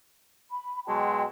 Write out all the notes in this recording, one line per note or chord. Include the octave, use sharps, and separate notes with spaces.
B5
B2 F#3 G#3 G5 A5 C6